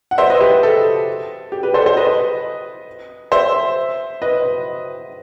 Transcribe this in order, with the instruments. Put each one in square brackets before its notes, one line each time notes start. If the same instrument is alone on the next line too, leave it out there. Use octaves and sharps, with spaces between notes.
[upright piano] F#5
C5 E5
B4 D#5
G4 B4
A4
G4
G4 B4
A4 C5
A4 C5
B4 D#5
C5 E5
B4 D#5